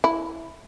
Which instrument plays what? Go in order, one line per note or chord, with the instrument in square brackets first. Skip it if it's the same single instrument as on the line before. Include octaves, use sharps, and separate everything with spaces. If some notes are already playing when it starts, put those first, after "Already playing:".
[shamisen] E4